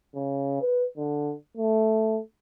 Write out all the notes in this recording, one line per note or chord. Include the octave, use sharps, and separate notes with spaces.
C#3
B4
D3
A3